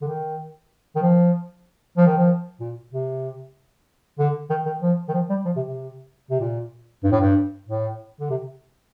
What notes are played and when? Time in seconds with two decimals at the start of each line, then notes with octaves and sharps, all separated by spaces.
0.02 D3
0.07 D#3
0.96 D#3
1.02 F3
1.97 F3
2.07 D#3
2.17 F3
2.60 A#2
2.92 C3
4.19 D3
4.50 D#3
4.66 D#3
4.82 F3
5.08 D#3
5.14 F3
5.30 G3
5.45 F3
5.56 C3
5.66 C3
6.30 C3
6.40 A#2
7.04 G2
7.12 A2
7.20 G2
7.67 A2
8.20 D3
8.30 C3